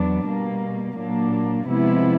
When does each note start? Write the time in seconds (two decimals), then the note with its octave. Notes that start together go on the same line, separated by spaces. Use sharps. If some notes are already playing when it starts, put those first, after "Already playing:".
Already playing: E2 F#3 B3 D4
0.25 B2 G3 A#3
0.96 A#2 F#3 A#3 D4
1.67 C3 F3 G#3 B3 E4